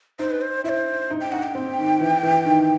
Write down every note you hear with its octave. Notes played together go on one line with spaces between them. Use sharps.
D#4 C5
B4
C5
E4 C5 E5
D#4
G5
D#4 F#5
G5
C4
D#3
E3
E3
D#3